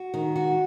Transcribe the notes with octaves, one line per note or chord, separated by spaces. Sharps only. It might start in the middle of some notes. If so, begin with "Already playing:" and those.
Already playing: F#4
D#3
F#4